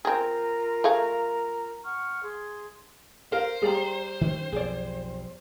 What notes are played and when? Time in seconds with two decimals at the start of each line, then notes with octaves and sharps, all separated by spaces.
0.05 C4 F4 G#4 A#4 A#5
0.84 A3 G#4 F5
1.84 F#5 C#6 F6
2.22 G#4 C6
3.32 A#4 C5 F5
3.62 G3 G#4 D5 A#5
4.21 D#3 C#4
4.52 B1 F2 G#4 D5